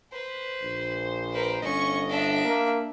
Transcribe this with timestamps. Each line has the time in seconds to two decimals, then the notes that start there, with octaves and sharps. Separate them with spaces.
0.12 B4 C5
0.62 A#1
1.33 A#4 B4
1.62 G1 C#4 D#5 C#6
2.09 D4 E5
2.45 A#3